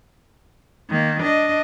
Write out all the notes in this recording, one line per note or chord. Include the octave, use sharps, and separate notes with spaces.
D#3 A#3
D4 D#5